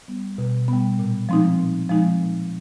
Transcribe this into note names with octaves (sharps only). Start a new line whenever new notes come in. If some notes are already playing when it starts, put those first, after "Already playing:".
G3 B3
B2
G3 B3
A#2
F3 G#3 C4 D#4
A#2
F3 G#3 C4 D#4
A#2